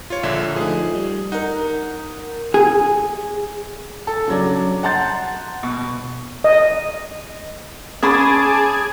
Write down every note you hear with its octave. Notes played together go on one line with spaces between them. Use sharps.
F4 C#5
A#1 D3 E5
F3 A3 D#4 G#4
G3
D#4 A#4 F#5
G#4
A4
C#3 F#3 D4
F#5 A5 A#5 C6 G6 A6
B2
D#5
C#4 G#4 G#5 A5 B5 D6